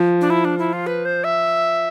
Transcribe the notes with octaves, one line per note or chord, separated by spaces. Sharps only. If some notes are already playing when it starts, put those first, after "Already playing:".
Already playing: F3
D4
E4
D4
E4
F4
B4
C5
E5